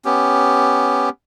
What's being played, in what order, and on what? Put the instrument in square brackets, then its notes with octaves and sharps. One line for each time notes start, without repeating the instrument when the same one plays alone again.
[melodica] B3 C#4 G4